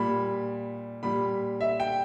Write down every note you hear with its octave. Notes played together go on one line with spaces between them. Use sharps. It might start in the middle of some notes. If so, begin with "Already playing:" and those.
Already playing: A#2 G3 B5
A#2 G3 B5
E5
G5